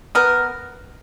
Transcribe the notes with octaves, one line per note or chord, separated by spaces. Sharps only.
B3 A#4